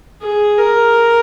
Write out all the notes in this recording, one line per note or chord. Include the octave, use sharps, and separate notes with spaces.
G#4
A#4